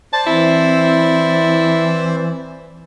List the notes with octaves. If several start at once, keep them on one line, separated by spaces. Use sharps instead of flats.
C5 D5 A5
E3 C4 E4